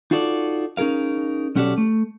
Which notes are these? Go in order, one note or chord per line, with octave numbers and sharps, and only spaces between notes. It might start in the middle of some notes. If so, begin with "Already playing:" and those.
D#4 F4 F#4 A4 C#5 D5
C#4 D#4 G#4 A#4 F5
B1 C#4 F#4 G4 A4 D5
A3